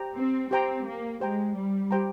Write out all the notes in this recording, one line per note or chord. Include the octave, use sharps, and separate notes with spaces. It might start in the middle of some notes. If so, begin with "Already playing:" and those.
Already playing: G4 C5 G5 A#5
C4
C4 G4 C5 G5 A#5
A#3
G#3 G4 C5 G5 A#5
G3
G4 C5 G5 A#5